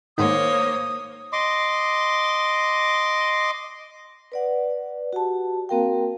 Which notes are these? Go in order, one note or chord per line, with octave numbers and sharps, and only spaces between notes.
G#2 D#3 A#3 C5 C#5 D#6
D#5 C6 D6
B4 D5 F#5
F#4 G4 A5
A#3 C4 F#4 A#4 F5 G5